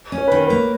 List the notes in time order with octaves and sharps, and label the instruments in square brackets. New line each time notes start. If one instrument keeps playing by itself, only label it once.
[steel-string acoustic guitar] C#4
[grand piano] C#5
[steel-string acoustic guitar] D#3 [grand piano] B4
[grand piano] A#4
[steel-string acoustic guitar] A#3 [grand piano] B4